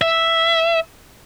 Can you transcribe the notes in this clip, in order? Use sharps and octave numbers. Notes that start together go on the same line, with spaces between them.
E5